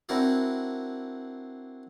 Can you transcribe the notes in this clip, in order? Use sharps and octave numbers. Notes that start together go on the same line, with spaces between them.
C4 D4 E4 F#4 A#4 D5